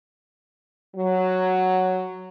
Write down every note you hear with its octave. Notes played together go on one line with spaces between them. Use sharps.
F#3